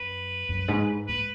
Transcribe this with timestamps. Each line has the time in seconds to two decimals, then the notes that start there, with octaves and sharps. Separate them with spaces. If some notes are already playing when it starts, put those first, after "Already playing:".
Already playing: F#2 B4
0.49 F#2
0.68 G#2
1.08 G#2 B4